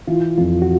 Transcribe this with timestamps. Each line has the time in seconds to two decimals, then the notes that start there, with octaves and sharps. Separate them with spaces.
0.07 E3 F4
0.37 F2 F4
0.62 F#4